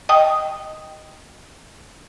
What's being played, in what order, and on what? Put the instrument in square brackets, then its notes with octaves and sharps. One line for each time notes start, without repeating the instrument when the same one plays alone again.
[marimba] D#5 G5 D#6